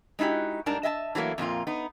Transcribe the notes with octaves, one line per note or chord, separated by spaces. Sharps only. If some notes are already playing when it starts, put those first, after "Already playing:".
G#3 D#4 E4 F#4 G4
G#2 G3 D4 A#4 A5
D#5 E5 G#5 A5
E3 F#3 A3 A#3
F2 A#2 A#3 F4
B3 D#4